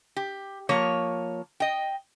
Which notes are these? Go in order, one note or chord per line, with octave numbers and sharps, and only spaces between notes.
G4
F3 A#3 C#5
D#5 G5